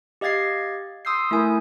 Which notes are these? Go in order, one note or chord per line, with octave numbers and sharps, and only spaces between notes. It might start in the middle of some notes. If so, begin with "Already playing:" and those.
G4 D#5 F5 G#6 A6 C7
C6 D#6 E6 G6 C7
A3 E4 A#4 G#5